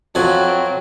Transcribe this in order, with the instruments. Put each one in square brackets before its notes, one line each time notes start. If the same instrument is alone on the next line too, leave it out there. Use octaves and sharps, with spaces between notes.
[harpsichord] F2 F3 G#5 [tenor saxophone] F#3 [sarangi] C4 [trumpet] F#4